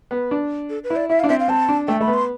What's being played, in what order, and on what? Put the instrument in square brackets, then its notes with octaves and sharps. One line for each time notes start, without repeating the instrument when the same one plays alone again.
[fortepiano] B3
D4
[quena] A4
B4
[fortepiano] E4
[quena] D5
[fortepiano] E4 [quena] E5
[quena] F5
[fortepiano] D4
[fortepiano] C4 [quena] E5
[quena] F5
[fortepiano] C4 [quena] A5
[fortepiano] D4
[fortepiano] A3 [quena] G5
[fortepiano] A3 [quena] B5
[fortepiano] B3
[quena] C6